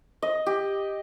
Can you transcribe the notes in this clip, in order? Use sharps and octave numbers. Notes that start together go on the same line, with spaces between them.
D#5
G4